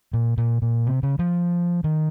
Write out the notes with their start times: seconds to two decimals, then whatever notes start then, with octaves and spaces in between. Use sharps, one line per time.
0.13 A#2
0.38 A#2
0.62 A#2
0.87 C3
1.03 C#3
1.19 F3
1.84 D#3